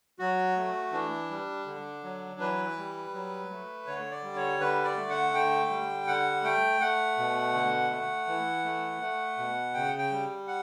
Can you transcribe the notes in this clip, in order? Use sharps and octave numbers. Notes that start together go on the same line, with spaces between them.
F#3 F#4
A3
E3 D4
G3
D3
F#3
E3 B4
G3
F#3
A3
D3 C#5
D5
G3
C#5
D3 B4
D5
A3
F#5
D3 G5
G3
D3 F#5
A3 G5
A3 F#5
B2
D3
A3
E3
A3
A3
B2
C#3 G5
G5
G3
F#5